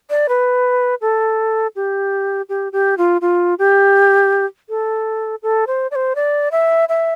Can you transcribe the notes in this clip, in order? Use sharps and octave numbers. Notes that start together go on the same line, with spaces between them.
D5
B4
A4
G4
G4
G4
F4
F4
G4
A4
A4
C5
D5
C5
D5
E5
E5